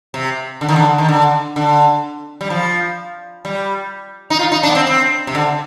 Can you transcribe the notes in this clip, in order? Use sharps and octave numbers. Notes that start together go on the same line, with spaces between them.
C3
D3
D#3
D3
D#3
D3
D3
G3
F3
G3
D#4
F4
D#4
D4
B3
C4
C4
C3
D3